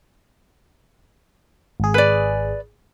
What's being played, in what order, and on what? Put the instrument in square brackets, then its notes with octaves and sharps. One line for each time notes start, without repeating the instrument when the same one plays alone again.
[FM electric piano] G#1 G#4
[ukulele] B4 D5